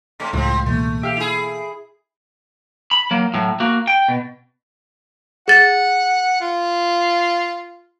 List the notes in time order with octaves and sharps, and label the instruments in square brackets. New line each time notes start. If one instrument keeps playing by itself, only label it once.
[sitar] C3 A3 C4
[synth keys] C#2 A2 [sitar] F3 C4
[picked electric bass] B2 E3 A#3 [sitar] A3
[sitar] G4 [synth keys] E5 F5
[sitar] E4 G#4
[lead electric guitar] B5
F#3 A#3
A2 F#3
A#3 F#4
G5
B2
[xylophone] G#4 A6 [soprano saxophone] F#5
[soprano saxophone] F4